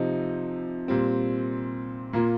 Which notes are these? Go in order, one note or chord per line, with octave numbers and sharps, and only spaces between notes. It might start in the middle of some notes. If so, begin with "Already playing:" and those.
Already playing: C3 F3 D#4
A#2 G3 C4
A#2 A#3 F4